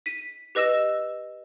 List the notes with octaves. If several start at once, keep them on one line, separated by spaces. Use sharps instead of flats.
B6 D#7
G4 B4 D#5 E6 E7